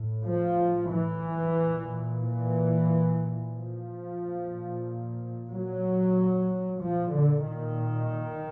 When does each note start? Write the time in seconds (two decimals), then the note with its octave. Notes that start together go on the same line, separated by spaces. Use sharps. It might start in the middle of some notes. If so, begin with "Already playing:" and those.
Already playing: A2
0.25 F3
0.90 E3
1.57 A#2
2.21 E3
3.52 F3
4.18 A#2
5.50 F#3
6.80 A#2 F3
7.13 D3
7.45 D#3